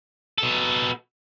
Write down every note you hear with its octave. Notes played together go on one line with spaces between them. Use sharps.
B2 A4